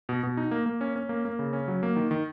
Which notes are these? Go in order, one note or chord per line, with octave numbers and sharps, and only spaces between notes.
B2
B2
D#4
A#3
A#3
C#4
C#4
A#3
A#3
C#3
C#4
F#3
A#3
D#3
D#3